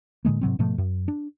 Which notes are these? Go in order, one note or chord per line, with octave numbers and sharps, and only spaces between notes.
A2 D3 G#3 A#3
G#2 C3 F#3 C4
G#2 B2 F3 A3
F#2
D4